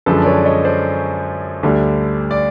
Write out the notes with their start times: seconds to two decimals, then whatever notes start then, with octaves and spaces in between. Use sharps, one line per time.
0.06 F#2 D3 F3 G#3 A4 B4
0.22 D5
0.26 B4 C#5
0.45 C#5 D#5
0.65 C5 D5
1.63 D2 D3 G3
2.31 D5